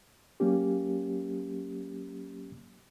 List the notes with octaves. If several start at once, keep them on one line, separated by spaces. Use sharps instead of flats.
F#3 A#3 C#4 G4